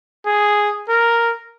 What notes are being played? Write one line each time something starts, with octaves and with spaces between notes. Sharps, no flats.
G#4
A#4